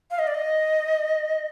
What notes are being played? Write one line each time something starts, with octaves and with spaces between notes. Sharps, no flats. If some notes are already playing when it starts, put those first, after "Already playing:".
F5
D#5
D5
D#5